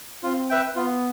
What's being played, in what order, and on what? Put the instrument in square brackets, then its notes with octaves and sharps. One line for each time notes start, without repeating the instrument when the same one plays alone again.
[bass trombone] C4 [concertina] F4
[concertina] B4 E5 G5
[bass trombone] B3 [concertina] F4